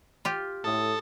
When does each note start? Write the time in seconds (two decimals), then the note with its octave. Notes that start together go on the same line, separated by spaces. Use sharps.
0.25 F4 G4
0.64 A2 A4 D#6